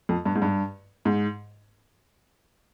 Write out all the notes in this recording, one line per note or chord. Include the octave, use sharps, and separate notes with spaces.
F2
G2
G#2
G2
G#2